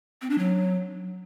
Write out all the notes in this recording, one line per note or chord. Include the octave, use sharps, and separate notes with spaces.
C4
D4
F#3